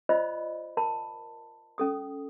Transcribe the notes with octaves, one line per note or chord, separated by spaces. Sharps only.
F4 C5 D5 D#5 B5 E6
A#4 A5 B5
C#4 A4 D#6